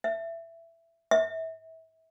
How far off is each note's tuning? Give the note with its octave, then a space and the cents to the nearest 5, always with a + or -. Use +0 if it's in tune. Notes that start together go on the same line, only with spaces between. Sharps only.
E5 +15
E5 -30